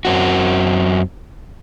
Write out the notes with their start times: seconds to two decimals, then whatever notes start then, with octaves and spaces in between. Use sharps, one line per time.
0.05 F#2 C4 F#4